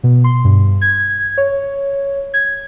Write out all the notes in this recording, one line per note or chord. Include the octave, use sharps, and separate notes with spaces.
B2
C6
G2
G#6
C#5
G#6